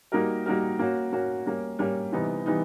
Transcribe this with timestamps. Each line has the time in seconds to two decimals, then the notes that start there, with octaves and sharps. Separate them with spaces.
0.12 G3 A#3 D#4 F#4 A#4
0.46 G3 A#3 D#4 F#4 A#4
0.79 A#3 C#4 F#4
1.12 A#3 C#4 F#4
1.46 G3 A#3 C#4
1.79 G3 A#3 C#4
2.12 C3 E3 G3 B3 D#4
2.46 E3 G3 B3 D#4